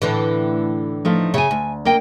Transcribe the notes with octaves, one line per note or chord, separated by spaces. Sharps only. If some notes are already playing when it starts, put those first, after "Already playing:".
A2 D3 E3
F3 A3 D#4
C#3 E5 G5 G#5
D2
A#3 D#5 G5